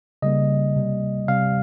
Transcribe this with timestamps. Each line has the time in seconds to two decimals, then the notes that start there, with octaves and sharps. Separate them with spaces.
0.22 C#3 G3 A#3 D#5
0.76 C3 G3 A#3
1.28 C3 G3 C4 F5